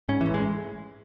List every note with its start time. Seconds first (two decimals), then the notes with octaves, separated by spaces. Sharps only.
0.09 G#2 C#4
0.21 E3
0.26 A1
0.34 G#3